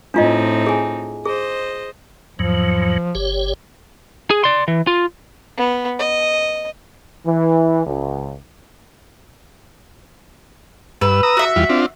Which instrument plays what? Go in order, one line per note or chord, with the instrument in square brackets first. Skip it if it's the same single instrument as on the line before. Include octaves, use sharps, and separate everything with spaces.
[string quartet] A2 C4 D#4 [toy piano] D4 F4 D#5
[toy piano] G#4 G#5
[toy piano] G#4 [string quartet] C5 D#5
[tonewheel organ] E2 G#2 F#3 [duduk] F3
[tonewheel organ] G1 G4 C#5
[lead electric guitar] G#4
D5 C6
E3
F4
[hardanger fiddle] B3
D#5
[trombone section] E3
C#2
[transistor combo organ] G2 E6 [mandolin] B4
[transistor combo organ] A#5 D#6 E6
[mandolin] F#4 E5
[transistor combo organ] E2 G3 F4
C4 D4 F4